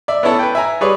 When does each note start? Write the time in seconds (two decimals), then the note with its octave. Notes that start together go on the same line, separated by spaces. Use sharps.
0.08 D5 E5
0.23 B3 C#4 E4 A4
0.39 B4 G5
0.55 E5 G#5 A#5
0.81 G3 G#4 B4 C#5 D5